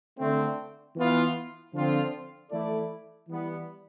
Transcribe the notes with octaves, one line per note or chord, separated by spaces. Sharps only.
D3 A3 C4
E3 B3 F4
D3 F3 C4 F4
E3 A3 E4 A4 D5
E3 G3 B3